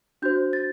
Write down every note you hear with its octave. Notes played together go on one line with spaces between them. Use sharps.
D4 F#4 C5 G6
A6